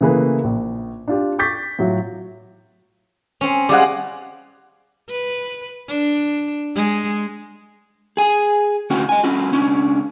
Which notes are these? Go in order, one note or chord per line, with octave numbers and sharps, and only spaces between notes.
C#3 E3 A3 A#3 G#4 B4
A#1
D4 F4 G4
C#6 D6 G6 A6 B6
A2 F#3 F4
C4 C#4
G3 G#3 G#4 D5 F5 F#5
B4
D4
G#3
G#4 G#5
D2 C#4 F#4 F#5 G5
D#5 G#5
C#4 F4 F#4
C#2 C#4 D4